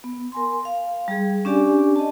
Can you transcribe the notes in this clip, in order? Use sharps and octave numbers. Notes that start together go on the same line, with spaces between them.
B3
A#4 G#5 C6
F5
G3 G#4
C#4 D4 G4 D5 G#5
D#5 A5